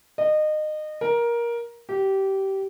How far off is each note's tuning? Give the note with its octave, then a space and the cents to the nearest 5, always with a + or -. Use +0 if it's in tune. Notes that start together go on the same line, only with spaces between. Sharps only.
D#5 -25
A#4 +15
G4 -20